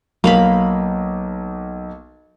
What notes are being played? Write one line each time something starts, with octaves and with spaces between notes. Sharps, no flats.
B1 A#3 F5 B5